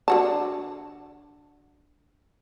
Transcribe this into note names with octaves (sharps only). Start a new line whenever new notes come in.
D3 F#4 A5